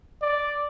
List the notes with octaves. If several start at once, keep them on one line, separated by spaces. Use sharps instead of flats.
D5